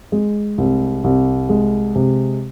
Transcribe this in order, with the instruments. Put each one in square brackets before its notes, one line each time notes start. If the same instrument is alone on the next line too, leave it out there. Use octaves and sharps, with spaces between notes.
[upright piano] G#3
C2
C2
G#3
C3